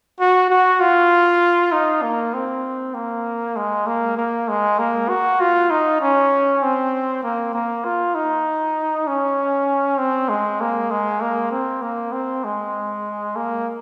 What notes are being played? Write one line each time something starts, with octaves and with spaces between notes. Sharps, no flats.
F#4
F#4
F4
D#4
A#3
C4
A#3
G#3
A#3
A#3
G#3
A#3
F#4
F4
D#4
C#4
C4
A#3
A#3
F4
D#4
C#4
C4
G#3
A#3
G#3
A#3
C4
A#3
C4
G#3
A#3